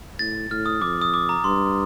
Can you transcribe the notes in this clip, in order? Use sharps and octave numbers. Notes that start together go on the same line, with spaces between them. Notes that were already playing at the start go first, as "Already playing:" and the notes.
A2 A6
A2 F6
D#6
F2 D6
D#6
D6
A#5
G2 C6